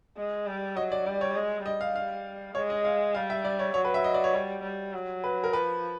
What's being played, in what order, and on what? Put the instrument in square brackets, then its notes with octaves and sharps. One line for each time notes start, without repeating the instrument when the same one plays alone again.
[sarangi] G#3
G3
[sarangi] F#3 [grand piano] D#5
[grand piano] D5
[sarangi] G3 [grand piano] D5
[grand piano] C#5
[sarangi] G#3
[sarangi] G3 [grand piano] D#5
[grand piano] F5
F5
[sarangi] G#3 [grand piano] C#5
[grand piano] D#5
F5
[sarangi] G3 [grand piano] F5
[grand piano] E5
D5
C#5
[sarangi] F#3 [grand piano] C#5
[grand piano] B4
E5
D#5
D5
C#5
[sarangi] G3 [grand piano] C#5
[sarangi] G3
F#3
[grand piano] B4
A#4
[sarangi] F3 [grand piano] B4